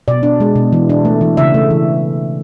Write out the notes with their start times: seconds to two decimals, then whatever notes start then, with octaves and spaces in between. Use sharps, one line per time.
0.08 B2 D5
0.23 D4
0.40 G#3
0.56 B2
0.73 E3
0.89 D4
1.05 A3
1.21 E3
1.37 C#3 E5
1.54 A3
1.70 E3